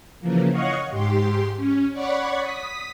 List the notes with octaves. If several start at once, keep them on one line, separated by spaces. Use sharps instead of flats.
C#3 E3 F3 A#3
C#5 D#5 F5 F#5 C#6
G#2 G4 C6
C#4
C#5 D5 F#5 B5 C#6
D#6 B6